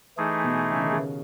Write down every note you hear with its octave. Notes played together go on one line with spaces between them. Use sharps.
E3 A3 D#4 G#4
B2
C#3
D#3
C#3